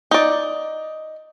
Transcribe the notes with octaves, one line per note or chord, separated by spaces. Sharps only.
D#4 D5